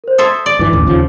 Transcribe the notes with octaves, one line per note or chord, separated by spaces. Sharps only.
A#4 C5
A4 C5 E5 D#6 G#6
D5
G2 E3 D6
A1 D#2
D#2 C#3 F3